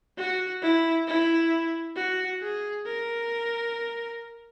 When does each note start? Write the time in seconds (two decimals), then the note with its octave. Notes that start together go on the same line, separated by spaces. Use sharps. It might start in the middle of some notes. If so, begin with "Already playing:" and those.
0.18 F#4
0.62 E4
1.07 E4
1.96 F#4
2.41 G#4
2.86 A#4